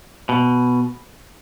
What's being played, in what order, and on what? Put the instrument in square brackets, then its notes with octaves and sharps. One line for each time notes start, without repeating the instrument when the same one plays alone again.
[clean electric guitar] B2